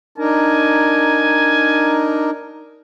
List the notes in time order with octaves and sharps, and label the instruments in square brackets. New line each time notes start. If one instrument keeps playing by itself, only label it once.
[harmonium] D4 D#4 A#4 [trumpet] G#5